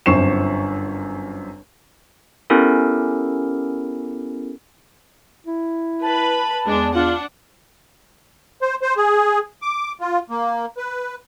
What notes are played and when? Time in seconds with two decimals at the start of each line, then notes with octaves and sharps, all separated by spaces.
0.06 G1 F#2 C4 C#6 C7 E7
2.50 B3 C#4 E4 G4 A4 A#4
5.47 E4
6.02 B4 A5 B5
6.66 E2 G#3 D4
6.94 D4 F4 F#5
8.62 C5
8.82 C5
8.97 G#4
9.62 D6
10.01 F4
10.30 A#3
10.77 B4